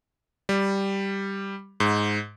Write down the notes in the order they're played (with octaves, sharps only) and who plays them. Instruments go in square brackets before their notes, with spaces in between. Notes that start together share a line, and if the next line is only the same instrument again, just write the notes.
[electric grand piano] G3
G#2